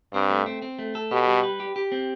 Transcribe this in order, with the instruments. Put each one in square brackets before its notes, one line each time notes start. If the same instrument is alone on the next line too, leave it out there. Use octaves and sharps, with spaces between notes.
[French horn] G2 [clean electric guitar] C4
[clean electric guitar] A3
C4
C4
A3
A4
[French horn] B2 [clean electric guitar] G4
[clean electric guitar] G3
B4
G4
G4
C4